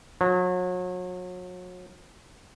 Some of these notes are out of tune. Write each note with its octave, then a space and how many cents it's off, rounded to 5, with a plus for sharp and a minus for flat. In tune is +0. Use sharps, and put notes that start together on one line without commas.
F#3 -35